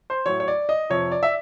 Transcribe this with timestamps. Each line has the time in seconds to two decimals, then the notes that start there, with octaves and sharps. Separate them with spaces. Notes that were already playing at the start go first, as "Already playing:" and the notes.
0.10 C5
0.26 A2 F#3 C#5
0.40 C#5
0.48 D5
0.69 D#5
0.90 F2 C3 F3 C#5
1.12 D5
1.23 E5